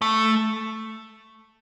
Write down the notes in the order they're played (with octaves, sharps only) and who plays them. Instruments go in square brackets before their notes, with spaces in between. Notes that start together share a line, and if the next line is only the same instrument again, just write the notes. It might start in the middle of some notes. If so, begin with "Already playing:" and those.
[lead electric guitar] A3